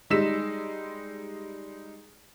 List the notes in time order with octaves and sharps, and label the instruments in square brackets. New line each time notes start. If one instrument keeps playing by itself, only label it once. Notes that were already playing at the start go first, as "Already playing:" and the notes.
[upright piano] G3 G#3 D#4 E6 B6 E7